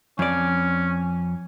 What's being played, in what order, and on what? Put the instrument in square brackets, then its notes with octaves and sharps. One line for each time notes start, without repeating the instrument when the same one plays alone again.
[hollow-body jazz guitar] F2 D5 [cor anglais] C#4